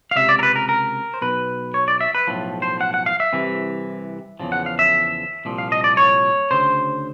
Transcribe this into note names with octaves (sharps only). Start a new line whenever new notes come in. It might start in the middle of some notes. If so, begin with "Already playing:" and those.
F5
C#2 C3 E5
D5
A#4
B4
A#4
A#4
C5
B1 B2 B4
C#5
D5
E5
B4
B1 A2 F3
C5
F#5
F#5
F5
E5
C2 C3 E3
E2 C#3 F3
F#5
F5
E5
C2 A#2 F3
F5
D#5
D5
C#5
D2 C#3 C5